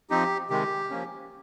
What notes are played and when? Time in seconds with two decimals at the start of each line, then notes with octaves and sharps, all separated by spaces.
0.10 F3 C4 D#4 G4
0.50 C3 D#3 G#3 G4
0.90 F3 A#3 C#4